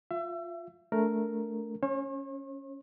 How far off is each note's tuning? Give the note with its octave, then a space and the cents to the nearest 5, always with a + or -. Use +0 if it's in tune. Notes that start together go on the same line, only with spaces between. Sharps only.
F4 +10 E5 +30
A3 +0 D4 -20 A#4 +0
C#4 +0 C#5 -45